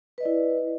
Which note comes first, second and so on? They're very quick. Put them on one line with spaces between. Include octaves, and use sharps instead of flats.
B4 D#5 D5 E4